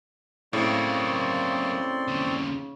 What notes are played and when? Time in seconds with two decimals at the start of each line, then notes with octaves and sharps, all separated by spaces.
0.53 A2 C#3 F#3 A#3 C4 D5 C6
2.08 D#2 C#3